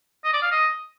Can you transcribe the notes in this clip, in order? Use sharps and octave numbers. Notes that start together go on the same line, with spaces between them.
D#5
D5
F5
D#5